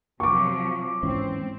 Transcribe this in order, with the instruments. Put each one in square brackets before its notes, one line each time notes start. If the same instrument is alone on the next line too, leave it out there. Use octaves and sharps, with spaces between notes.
[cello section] C3 F3 F#3 [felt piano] C#6 D6
[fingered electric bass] G#2 E3 C#4 [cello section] C4